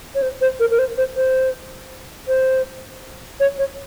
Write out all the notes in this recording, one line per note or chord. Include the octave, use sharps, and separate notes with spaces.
C#5
C5
C5
A#4
A#4
C5
C5
C5
C5
C#5
C#5